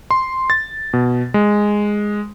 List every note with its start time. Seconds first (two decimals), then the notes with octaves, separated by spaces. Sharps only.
0.11 C6
0.50 A6
0.93 B2
1.34 G#3